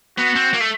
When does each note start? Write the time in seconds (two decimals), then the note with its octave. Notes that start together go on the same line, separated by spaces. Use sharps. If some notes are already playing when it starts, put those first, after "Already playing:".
0.18 B3 F#4
0.36 C4
0.53 A#3
0.60 A3